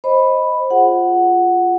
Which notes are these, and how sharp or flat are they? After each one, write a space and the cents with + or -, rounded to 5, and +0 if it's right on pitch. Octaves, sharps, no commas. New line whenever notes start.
C5 +15 D#5 +0 B5 +0
F4 +0 G#4 +0 F#5 +0